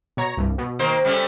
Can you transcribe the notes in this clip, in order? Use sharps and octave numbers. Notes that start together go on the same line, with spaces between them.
B2 C#5 A#5
C2 G2
B2
D#3 A#3 C5
C#3 G3 A3 C#4